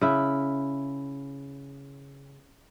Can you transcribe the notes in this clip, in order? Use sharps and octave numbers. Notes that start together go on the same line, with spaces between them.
C#3 E4